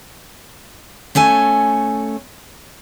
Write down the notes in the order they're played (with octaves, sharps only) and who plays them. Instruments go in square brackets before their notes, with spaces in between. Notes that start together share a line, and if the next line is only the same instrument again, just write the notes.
[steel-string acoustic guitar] A3 C#4 A4 G#5